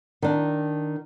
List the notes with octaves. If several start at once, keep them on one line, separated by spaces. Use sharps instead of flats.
D#3 D4